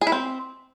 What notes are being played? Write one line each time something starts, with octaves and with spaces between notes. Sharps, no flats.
G#4
E4
C4